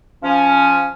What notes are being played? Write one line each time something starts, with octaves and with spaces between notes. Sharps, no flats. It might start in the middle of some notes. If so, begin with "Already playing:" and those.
F3 C#4